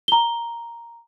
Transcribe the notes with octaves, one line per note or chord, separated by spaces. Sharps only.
A#5 G7